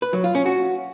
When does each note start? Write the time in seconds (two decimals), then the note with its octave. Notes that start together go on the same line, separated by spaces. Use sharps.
0.02 B4
0.13 F#3
0.24 F4
0.35 C#4
0.46 F#4